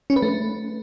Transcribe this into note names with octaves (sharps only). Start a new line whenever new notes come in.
C#4
B4
A3